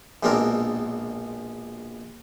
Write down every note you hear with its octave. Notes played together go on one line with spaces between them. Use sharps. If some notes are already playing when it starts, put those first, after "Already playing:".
A#1 B2 G#3 C4 D4 A#4